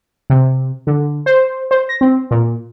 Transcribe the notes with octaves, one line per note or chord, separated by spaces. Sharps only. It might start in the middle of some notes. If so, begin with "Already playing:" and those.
C3
D3
C5
C5
A#6
C4
A#2